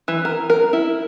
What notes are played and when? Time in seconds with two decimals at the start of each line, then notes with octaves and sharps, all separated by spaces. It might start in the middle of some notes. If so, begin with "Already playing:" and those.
0.08 E3
0.25 A#4
0.50 A#4
0.73 E4